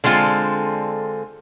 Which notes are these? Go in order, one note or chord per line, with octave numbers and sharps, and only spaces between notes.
D3 G#3 C4 F4 A4